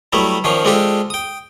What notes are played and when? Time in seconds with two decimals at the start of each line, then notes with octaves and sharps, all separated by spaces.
0.13 F#3 G3 A3 B3 E4
0.44 D#3 F3 C#4 D4 C5
0.65 G#3 C4 D4 F4 G4 A4
1.10 G5 D#6